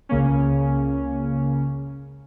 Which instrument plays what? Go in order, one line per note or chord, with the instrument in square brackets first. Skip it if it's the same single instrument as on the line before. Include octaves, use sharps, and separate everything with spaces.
[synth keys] C#2 C#3 A#3 C#4